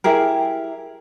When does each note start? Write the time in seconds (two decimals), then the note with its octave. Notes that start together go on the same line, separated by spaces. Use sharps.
0.04 E4 G4 G#4 A#4